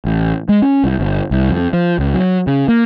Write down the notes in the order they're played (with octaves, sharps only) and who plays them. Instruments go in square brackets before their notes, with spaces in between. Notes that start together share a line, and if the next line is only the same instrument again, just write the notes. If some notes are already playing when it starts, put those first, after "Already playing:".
[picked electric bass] A1
G#3
C#4
C2
G1
C2
F2
F3
C#2
F#3
C#3
A#3